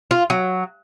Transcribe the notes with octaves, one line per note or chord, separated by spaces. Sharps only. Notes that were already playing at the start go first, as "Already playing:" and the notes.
F4
F#3